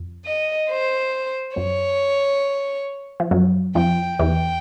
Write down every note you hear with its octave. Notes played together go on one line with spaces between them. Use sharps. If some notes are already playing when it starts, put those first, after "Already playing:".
Already playing: F2
D#5
C5
F#2 F#3 C#5
F3
F#2 F#3
F2 F3 G5
E2 E3 G5